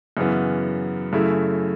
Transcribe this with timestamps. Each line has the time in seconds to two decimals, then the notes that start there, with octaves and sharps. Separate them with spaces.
0.17 F#2 C#3 E3 B3
1.12 F#2 C#3 A3 E4